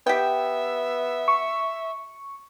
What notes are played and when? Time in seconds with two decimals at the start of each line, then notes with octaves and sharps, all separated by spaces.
0.06 B3 G4 E5 G5
1.28 C#6